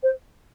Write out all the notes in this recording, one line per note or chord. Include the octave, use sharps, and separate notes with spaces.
C5